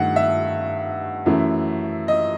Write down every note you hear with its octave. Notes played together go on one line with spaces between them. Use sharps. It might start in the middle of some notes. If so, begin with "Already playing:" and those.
Already playing: G2 D#3 A3 F#5
E5
F#2 E3 A3
D#5